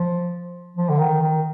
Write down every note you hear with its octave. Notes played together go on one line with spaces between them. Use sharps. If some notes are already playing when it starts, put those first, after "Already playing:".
Already playing: F3
F3
D3
D#3
D#3